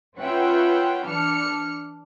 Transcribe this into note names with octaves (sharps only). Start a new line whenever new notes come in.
C#4 F4 B4 E5 F#5 G5
E3 D4 F6 C#7